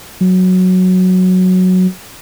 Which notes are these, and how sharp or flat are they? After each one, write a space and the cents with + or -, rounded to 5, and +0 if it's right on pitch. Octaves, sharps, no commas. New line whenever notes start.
F#3 -5